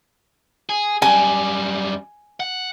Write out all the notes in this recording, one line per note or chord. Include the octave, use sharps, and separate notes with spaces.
G#4
F#2 G3 G#5
F#5